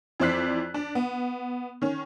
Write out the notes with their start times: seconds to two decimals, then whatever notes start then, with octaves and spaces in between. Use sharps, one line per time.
0.20 F2 E3 C5 D5 F#6 B6
0.74 D4
0.95 B3
1.82 D#3 C#4